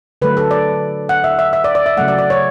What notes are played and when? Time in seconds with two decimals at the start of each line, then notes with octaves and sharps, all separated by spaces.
0.22 D3 F#3 A3 B4
0.37 A4
0.51 D5
1.09 F#5
1.24 E5
1.39 E5
1.53 E5
1.64 D5
1.75 D5
1.86 E5
1.97 C#3 F#3 A3 F#5
2.08 D5
2.19 D5
2.30 C#5